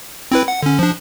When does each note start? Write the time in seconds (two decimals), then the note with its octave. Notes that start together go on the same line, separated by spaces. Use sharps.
0.32 C4 E4 B4
0.48 F#5
0.63 D3 C#4
0.79 F3 D4